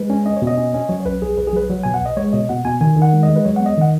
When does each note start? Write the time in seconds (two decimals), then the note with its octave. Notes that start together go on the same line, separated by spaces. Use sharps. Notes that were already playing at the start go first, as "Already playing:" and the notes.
Already playing: G#3 B4
0.10 C#4
0.25 C#4 D#5
0.37 C#5
0.42 B2
0.47 D#5
0.58 C#4
0.74 C#4
0.89 F#3 C#5
1.00 C#5
1.05 B1 B4
1.21 B1 G#4
1.37 B1 B4
1.47 G#4
1.53 F#3 B4
1.70 F#3
1.83 B2 G#5
1.94 F#5
2.01 B1 D#5
2.17 G#3 C#5
2.33 B2 D#5
2.49 B2 F#5
2.65 B2 G#5
2.81 D#3 G#5
2.96 D#3
3.02 F#5
3.13 G#3
3.23 D#5
3.29 G#3
3.36 B4
3.45 F#3 C#5
3.56 B3 F#5
3.66 D#5
3.77 D#3 F#5